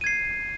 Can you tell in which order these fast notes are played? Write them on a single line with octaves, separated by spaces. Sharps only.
D#7 G#6 C7